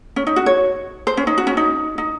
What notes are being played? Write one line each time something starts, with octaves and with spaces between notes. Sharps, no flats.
C#4
D#4
F#4
C#5
C5
C#4
D#4
F#4
C#4
D#4
D#4